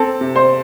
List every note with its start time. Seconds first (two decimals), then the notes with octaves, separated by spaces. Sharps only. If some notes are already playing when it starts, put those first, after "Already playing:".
Already playing: C4 A4 A5
0.21 C3
0.36 C5 C6